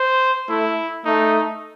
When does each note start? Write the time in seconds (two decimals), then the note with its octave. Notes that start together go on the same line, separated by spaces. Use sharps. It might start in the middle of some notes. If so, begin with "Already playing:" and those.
Already playing: C5
0.49 A3 E4
1.05 A3 D#4